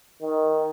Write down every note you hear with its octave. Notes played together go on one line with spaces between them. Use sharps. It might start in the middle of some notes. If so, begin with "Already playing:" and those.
D#3